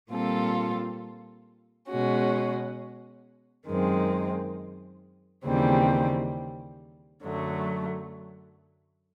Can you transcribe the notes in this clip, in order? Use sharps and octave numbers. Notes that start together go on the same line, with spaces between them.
A#2 G3 C4 F4 A4
B2 G#3 C#4 F#4
F#2 D#3 G#3 C4
D#2 C#3 E3 G3 C4
F#2 D3 F#3 A3